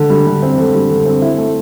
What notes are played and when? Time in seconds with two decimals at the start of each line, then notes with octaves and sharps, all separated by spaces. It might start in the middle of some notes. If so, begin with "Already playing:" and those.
Already playing: D3
0.10 G3
0.27 D3
0.42 C4
0.58 D3
0.74 G3
0.90 D3
1.05 C4
1.21 E4
1.38 A3